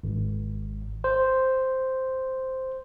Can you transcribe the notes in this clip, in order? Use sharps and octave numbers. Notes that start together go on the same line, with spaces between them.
G#1
C5